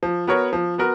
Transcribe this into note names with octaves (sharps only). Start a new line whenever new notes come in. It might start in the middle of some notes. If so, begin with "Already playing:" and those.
F3
B3 F#4 A#4 C#5
F3
B3 F#4 A#4